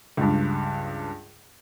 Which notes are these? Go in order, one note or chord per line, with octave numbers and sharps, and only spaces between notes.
C#2 G2